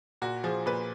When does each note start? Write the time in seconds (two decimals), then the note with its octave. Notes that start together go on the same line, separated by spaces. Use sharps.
0.22 A#2 F#4
0.44 F3 G#4
0.66 A#2 B4